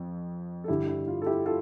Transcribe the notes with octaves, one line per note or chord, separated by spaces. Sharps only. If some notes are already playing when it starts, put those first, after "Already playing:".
Already playing: F2
A4
G2 D3 G3 E4 G4
E4
F4
A4
E4 G4
F4 A4